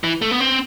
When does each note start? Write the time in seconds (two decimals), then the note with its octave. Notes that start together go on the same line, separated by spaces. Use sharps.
0.04 E3
0.22 A3
0.31 B3
0.40 C4